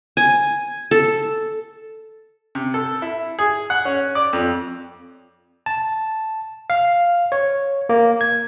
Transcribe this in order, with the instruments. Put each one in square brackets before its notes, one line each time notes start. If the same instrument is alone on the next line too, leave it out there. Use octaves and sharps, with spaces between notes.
[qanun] G#5
A4
[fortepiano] C3
A4
E4
G#4
F#5
C#4
D5
F2
[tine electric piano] A5
F5
C#5
A#3
G#6